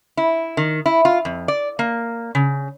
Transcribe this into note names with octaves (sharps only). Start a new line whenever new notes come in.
E4
D#3
E4
F4
F2
D5
A#3
C#3